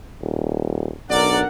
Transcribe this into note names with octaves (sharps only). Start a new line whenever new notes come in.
D#1
B1 D4 A#4 D5 F#5